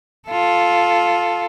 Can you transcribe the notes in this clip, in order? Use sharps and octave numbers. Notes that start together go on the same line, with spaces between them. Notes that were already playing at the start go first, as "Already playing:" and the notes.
F4 A4